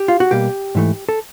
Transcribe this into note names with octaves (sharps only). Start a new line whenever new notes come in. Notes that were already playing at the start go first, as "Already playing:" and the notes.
Already playing: G4
F4
F#4
B2 G3 A#3 G4
G#2 E3 A3
A4